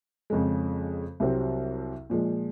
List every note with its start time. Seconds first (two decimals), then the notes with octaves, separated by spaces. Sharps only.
0.30 F2 C#3 G#3
1.20 C2 C3 F#3 C4
2.10 A#2 F3 G#3